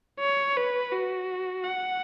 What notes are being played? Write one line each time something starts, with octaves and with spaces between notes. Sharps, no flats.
C#5
B4
F#4
F#5